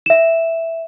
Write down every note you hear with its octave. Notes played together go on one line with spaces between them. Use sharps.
E5 E7